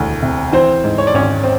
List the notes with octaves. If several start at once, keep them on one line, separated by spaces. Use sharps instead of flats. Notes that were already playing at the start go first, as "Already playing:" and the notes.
Already playing: E1 D2 E3
C3
E3 C4 C5
G#2
C#5
D5
G#1 C#4 C#5
C4